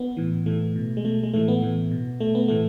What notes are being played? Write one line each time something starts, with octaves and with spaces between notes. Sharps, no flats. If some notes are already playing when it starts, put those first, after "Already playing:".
Already playing: B3
A2 E3
A2 E3 A3
B2
G#3
B2 A3
G#3
A2 E3 A3
B3
A2 E3
B2
B2 A3
B3
A2 E3 A3